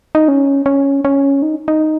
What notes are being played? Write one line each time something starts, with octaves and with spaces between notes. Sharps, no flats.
D#4
C#4
C#4
C#4
D#4
D#4